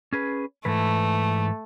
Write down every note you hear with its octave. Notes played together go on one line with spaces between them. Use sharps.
C#4 G#4 B4
G#2 E3 A3 B4